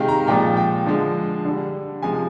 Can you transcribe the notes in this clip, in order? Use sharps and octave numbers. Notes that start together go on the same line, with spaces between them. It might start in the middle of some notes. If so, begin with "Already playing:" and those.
Already playing: C3 D#3 G#3 F5 G5
A#5
A#2 F3 G#3 G5
G5
D3 F3 G#3
D3 G3
C3 F3 G#3 G#5